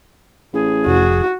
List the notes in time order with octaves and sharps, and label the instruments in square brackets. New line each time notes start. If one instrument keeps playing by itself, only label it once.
[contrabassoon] A1 [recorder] G#4
[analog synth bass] F1 [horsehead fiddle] F#4